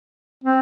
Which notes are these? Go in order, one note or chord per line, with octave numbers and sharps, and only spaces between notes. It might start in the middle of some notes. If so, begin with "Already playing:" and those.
C4